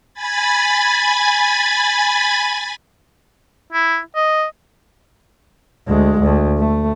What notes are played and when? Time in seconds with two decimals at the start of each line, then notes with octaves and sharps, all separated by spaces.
0.14 G#5 B5 G#6 A6
3.73 E4
4.16 D#5
5.88 D2 G#3
6.21 D2
6.58 A3